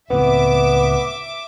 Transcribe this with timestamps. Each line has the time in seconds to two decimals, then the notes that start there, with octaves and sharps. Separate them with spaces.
0.10 C#2 A2 B3 C4 E5 D6